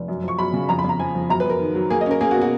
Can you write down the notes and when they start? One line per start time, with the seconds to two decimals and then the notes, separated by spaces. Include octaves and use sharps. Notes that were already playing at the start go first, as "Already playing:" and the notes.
Already playing: F1
0.08 F#2
0.24 F3 C#6
0.39 F#2 B5
0.54 C#3
0.69 F2 A#5
0.79 B5
0.84 F2 A#5
0.99 F3 G#5
1.15 F3
1.29 F#2 A#5
1.40 B4
1.45 F#2 A#4
1.60 D#3
1.75 F#3
1.90 A#3 G#4
2.01 D#5
2.06 C#4 A#4
2.21 A#3 G#4
2.31 F#4
2.36 B2
2.41 F#4